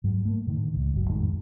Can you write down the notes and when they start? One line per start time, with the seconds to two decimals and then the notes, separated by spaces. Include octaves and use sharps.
0.04 G#2 F#3
0.25 A3 A#3
0.47 A2 D3 D#3
0.76 C#2
0.94 G1 F#3
1.10 F2 A2 D#3 G#3